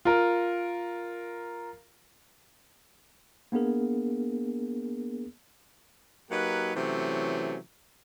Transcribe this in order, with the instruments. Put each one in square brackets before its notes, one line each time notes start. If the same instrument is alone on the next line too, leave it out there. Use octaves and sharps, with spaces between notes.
[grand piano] F4 A#4
[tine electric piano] A#3 B3 D4 G#4 A#4
[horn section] F#3 A#3 D#4 G4 B4
C3 E3 F#3 A3 C#4